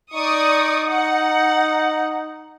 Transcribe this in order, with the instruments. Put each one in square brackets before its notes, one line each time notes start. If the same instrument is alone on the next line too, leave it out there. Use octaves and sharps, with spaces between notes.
[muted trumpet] D#4 [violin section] D5 C#6 D#6
[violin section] F#5